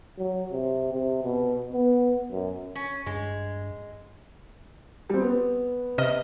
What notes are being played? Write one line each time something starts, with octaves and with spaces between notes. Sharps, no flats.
F#3
C3
C3
B2
B3
F#2
C#4
G2 G#3
G3 C4
B3
C3 D#5 F6